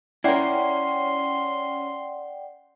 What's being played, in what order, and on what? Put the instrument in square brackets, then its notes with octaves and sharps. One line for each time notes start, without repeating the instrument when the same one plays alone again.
[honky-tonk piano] C#4 C7 [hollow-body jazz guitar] E4 A#4 [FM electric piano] D5 F#5 G5 [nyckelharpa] C6